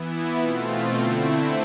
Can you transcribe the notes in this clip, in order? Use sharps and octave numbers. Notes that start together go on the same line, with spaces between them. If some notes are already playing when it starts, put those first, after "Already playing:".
Already playing: E3 B3 E4
B2 A3 C4 F4
D3 A3 C4 E4